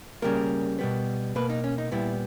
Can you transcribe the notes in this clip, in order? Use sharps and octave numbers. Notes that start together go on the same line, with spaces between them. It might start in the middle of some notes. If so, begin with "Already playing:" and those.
C#3 G3 A#3 A#4
B2 G3 B3
B2 A#3 B4
D#4
C#4
D#4
A#2 G3 B3 E4